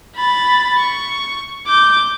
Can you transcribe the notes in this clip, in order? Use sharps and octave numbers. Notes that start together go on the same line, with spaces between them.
B5 A6
C#6
D6 G6